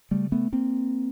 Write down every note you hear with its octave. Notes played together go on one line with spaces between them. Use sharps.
C#3 G3 A3
A3 B3
A#3 C4